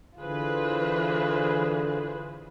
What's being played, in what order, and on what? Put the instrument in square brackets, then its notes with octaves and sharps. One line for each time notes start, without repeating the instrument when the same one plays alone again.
[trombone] D3 [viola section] E3 B4 C5 [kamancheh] F4 G#4